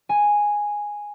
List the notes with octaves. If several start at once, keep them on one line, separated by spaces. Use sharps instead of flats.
G#5